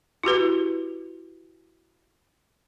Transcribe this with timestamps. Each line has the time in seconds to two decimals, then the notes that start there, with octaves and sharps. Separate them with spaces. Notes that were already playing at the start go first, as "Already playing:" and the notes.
0.24 E4 F#4 G4 B4